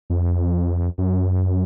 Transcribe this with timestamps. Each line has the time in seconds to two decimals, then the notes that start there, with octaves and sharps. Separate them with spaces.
0.10 F2
0.98 F#2